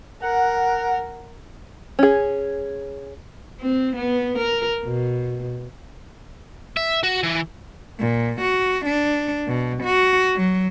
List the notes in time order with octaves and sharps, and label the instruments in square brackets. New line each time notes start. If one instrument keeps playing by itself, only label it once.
[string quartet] A#4 [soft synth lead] F#5
[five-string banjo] C#4 G#4
[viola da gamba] C4
B3
A#4
B2
[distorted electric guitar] E5
F#4
E3
[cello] A#2
F#4
D4
B2
F#4
F#3